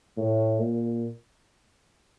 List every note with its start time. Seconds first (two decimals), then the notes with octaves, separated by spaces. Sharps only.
0.18 A2
0.59 A#2